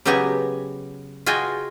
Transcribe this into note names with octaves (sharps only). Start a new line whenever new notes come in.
C#3 F#3 B3 G4 D#5 G#5
F4 F#4 G#4 D#5 G5 G#5